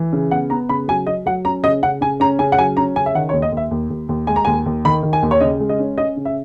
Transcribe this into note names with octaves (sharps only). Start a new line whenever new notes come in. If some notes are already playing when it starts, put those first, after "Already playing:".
Already playing: E3
C#3
B3 F#5
B3 A#5
C#3 B5
F#3 G#5
F#3 D#5
F#3 F#5
C#4 A#5
C#3 D#5
C#3 F#5
C#3 G#5
C#4 A#5
C#3 G#5
F#5
F#3 G#5
C#4 A#5
C#3 G#5
E5
D#3 F#5
C#5
D#2
D#5
D#2
E5
D#2
D#2
D#2
G#3 G#5
A#5
D#2 G#5
D#2
D#3 B5
D#3
G#5
D#2
C#5
C#3 D#5
G#3
D#5
C#4
C#4 D#5
C#3
E5